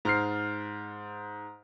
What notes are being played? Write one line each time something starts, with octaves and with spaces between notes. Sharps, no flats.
G#2 F6 C7